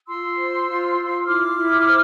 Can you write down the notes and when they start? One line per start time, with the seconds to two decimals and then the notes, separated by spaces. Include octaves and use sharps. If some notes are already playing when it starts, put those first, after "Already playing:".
0.08 F4 C6 E6
0.38 C5
0.68 F4
0.97 F4
1.27 E4 D6 F6
1.56 E4
1.87 C5